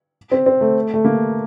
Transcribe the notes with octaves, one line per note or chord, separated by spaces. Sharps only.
C4
C4
A3
A3
A#3